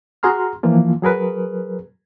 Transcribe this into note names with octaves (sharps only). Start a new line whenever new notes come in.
F#4 G#4 A#5 C6 F6
E3 F3 A#3 F4
F#3 G#4 A#4 B4